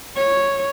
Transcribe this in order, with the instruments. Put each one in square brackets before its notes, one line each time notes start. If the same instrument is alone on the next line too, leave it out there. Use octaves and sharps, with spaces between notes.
[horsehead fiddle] C#5